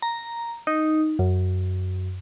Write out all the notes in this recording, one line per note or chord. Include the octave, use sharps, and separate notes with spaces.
A#5
D#4
F#2